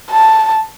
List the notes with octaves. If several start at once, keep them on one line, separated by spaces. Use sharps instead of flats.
A5